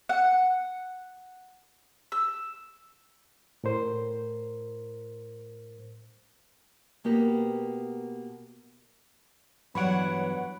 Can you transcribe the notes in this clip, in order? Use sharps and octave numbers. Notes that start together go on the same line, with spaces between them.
F#5
E6
A2 A#4 C5
B2 A#3 B3 G4 A#4
G2 E3 F#3 B3 C#5 F#5 B5 D7